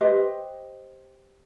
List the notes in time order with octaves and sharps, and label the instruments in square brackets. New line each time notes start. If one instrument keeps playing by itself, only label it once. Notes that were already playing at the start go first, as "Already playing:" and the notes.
[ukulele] G4 B4 C5 D#5